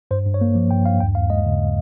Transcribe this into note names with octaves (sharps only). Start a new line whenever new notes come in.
G2 C5
G2
C#5
A#3
F3
G2 G5
G2 F5
D#2 G5
D#2 F5
G#3 D#5
C#3